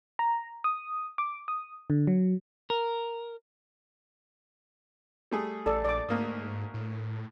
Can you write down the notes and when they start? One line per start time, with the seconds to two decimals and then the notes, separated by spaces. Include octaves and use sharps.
0.19 A#5
0.64 D#6
1.18 D6
1.48 D#6
1.90 D3
2.07 F#3
2.70 A#4
5.32 G3 A3 G#4
5.66 A1 A4 D5
5.85 A#1 D5 D6
6.09 D2 G#2 A#3 D#6
6.74 A2